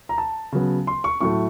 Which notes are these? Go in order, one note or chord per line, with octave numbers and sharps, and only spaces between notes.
A#5
A5
C#3 F#3 B3
C6
C#6
A2 F#3 A3 C#6